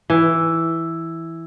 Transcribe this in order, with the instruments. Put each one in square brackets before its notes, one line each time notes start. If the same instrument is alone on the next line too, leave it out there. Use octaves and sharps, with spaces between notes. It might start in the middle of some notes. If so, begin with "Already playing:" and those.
[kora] E3